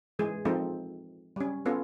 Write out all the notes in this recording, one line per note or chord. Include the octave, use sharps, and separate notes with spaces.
E3 G#3 G#4
F3 G#3 C4 D#4 A4 C5
G3 C#4
B3 C#4 F4 A4